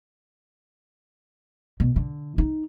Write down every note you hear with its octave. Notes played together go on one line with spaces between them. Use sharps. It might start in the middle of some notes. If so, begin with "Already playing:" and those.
B2
D3
D#4